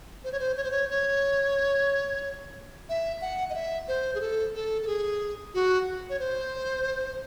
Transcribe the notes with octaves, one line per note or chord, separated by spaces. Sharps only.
C5
C#5
C5
C#5
C5
C#5
C#5
E5
F#5
D#5
E5
C5
G#4
A4
A4
A4
G#4
F#4
C#5
C5